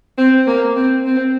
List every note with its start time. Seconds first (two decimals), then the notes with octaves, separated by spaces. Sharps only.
0.18 C4
0.47 A#3
0.76 C4
1.05 C4